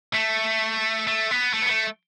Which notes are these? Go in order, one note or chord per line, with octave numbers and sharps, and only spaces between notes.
A3
A3
B3
A3
B3
A3